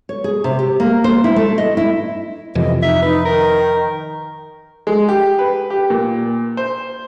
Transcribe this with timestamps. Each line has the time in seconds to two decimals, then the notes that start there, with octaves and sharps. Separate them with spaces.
0.09 C#5
0.24 G#4
0.44 C3
0.59 G4
0.80 A#3
1.04 C5
1.24 E4
1.36 A3
1.58 D#5
1.77 E4
2.55 F2 C3 E3 D#5
2.83 D#4 E5
3.02 D#4 B4
3.25 D#3 A#4
4.87 G#3
5.09 G4
5.39 B4
5.70 G4
5.90 A#2
6.57 C5